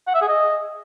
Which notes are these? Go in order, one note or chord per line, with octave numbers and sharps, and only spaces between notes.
F#5
E5
G#4
D#5